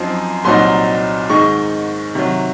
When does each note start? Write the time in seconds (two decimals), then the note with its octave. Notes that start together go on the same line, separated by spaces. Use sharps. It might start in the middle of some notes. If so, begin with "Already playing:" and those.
Already playing: F#2 F3 C4 D#4
0.44 C2 A#2 F#3 C4 D#4 C6
1.30 G#2 D#3 G#3 D#4 C#6
2.15 C3 D#3 F#3